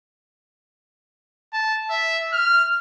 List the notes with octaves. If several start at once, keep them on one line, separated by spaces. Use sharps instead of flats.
A5
E5
F6